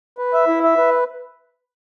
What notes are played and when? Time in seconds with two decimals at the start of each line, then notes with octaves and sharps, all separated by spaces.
0.18 B4
0.34 E5
0.48 E4
0.63 E5
0.77 B4